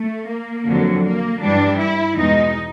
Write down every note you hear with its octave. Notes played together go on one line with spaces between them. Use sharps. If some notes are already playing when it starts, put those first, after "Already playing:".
Already playing: A3
A#3
F2 D3 F#3
A#3
G2 E3 G3 D4
E4
E2 B2 G#3 D#4